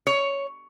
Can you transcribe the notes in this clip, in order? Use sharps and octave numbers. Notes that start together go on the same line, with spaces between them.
C#5